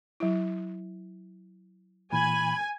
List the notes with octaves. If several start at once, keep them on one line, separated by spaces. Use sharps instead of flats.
F#3 E4
A#2 E3 G#5 B5